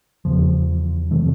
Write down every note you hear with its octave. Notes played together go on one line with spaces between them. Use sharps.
E2 C#3 F3
C3 E3 A3